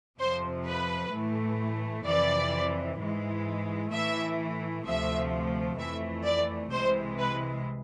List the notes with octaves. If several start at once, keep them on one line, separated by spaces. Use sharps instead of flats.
F2 C3 F3 C5
B4
A2 E3 A3
F2 C3 E3 D5
G#2 E3 G#3
A2 E3 A3 E5
D2 C3 F3 A3 E5
F2 E3 A3 E5
D5
C2 C3 E3 G#3 C5
B4